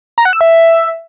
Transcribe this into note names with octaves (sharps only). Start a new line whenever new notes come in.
A#5
F#5
E6
E5